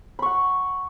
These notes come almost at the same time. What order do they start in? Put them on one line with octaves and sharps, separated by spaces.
B5 C#6 F#5